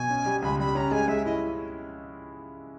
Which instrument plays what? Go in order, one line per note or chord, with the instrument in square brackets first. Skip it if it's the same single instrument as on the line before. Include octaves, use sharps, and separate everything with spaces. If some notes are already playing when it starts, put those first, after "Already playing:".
Already playing: [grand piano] B2 [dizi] G#5
[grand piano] C#4
G3
[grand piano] C#2 [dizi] B5
[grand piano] G3 [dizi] B5
[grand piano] C#4 [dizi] A#5
[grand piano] G#3 [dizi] G#5
[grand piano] G#3 [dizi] E5
[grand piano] E4 [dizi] D#5